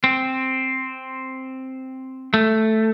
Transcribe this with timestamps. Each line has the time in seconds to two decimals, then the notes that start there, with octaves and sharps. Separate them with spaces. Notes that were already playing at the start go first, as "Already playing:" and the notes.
0.04 C4
2.34 A3